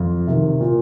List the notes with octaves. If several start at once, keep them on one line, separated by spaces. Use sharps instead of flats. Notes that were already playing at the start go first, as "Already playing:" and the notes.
Already playing: F2
C3 D#3
A#2